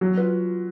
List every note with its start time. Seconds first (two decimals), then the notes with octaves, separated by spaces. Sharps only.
0.01 F#3 C#4
0.17 F4 B4